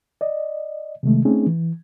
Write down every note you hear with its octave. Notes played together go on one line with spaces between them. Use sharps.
D5 D#5
C3 D#3 G#3 A3
A3 C4 C#4 D#4 G#4
E3